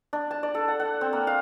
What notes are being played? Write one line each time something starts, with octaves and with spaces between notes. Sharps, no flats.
D4
A5
D5
A4
F#5
F#5
C4
A#3
F5